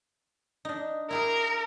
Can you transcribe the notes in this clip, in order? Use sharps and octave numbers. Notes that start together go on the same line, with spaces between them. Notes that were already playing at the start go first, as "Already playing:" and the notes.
D4 D#4
E4 G4 G#4 A#4